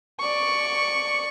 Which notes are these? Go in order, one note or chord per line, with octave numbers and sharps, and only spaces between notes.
D5 C#6